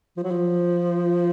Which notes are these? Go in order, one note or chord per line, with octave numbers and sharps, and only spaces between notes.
F3
F#3
F3